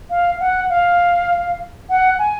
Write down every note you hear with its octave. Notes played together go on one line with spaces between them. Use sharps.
F5
F#5
F5
F#5
G#5